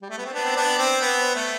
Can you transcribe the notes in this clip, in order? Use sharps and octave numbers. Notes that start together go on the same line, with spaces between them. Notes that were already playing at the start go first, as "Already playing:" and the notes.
G3
A3
B3
C4
B3 D4
C4
B3 D4
C4
B3
A3